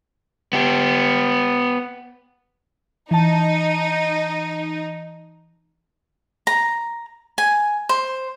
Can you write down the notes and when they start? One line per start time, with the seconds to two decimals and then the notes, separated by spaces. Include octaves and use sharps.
0.53 B3 G4
3.11 E3 D#4 A5
6.47 A#5
7.38 G#5
7.89 C5